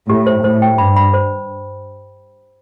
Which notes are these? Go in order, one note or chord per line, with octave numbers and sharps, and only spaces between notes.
A2 G4
C5
A2 C5
G5
G2 B5
B5
C5